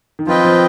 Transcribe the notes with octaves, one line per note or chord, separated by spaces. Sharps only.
D#3
F3 C4 F4 B4 D#5 G5
F3